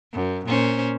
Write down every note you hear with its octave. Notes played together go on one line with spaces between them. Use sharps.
F#2
A#2 C#4 C5